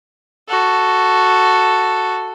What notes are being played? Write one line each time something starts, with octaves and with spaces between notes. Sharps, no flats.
F#4 A4